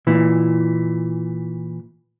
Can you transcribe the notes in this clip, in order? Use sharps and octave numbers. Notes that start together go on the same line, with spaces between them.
A#2 E3